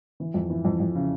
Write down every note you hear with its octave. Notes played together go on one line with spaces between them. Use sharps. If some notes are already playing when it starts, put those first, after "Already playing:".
E3
F2
E3
F2
F2
C#3